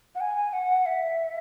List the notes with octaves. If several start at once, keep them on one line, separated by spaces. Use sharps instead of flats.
F#5
G#5
F#5
E5